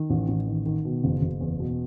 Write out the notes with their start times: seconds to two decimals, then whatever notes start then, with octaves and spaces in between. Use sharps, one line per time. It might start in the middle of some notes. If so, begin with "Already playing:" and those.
Already playing: D#3
0.10 A1
0.28 A1
0.46 D#3
0.66 D#3
0.85 B2
1.04 F#1
1.21 F#1
1.41 E2
1.60 B2